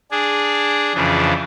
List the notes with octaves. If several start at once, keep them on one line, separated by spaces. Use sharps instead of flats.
D4 G#4
F2 C#3 E3 D4